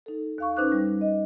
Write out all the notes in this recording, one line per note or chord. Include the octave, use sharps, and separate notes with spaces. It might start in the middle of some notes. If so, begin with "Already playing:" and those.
D#4 A4
D#2 F5 C#6
C#4 D#4 B4 C5 D6 F#6
G3
D#5